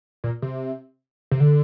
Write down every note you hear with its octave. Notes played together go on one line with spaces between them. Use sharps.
A#2
C3
C3
D3